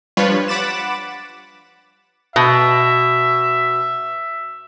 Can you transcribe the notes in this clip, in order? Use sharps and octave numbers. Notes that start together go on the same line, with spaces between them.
F3 G3 D4 F4 B4 C#5
F#5 B5 D6 A6 E7
B2 E5